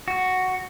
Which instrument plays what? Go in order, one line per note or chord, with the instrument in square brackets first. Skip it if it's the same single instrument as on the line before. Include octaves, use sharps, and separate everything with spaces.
[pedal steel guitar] F#4